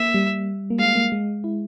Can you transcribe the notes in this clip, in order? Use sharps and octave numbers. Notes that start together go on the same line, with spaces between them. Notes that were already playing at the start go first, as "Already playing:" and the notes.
Already playing: A#3 E5
G3
A#3
G#3 F5
A#3
G#3
E4